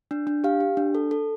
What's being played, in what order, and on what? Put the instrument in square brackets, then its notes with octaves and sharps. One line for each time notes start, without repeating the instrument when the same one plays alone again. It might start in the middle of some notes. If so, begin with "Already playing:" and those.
[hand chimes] D4
D4
G4 F5
G4
D4
A4
A4